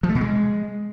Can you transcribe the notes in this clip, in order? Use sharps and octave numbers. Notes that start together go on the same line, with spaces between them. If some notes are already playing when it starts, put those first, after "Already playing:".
F3
A3
B2
G#3